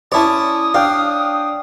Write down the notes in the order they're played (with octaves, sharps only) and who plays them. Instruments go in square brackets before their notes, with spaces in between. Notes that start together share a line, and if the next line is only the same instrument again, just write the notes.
[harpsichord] C#4 E4 D5 [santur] C#5 A5 [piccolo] D#6
[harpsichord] D4 [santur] F5 G5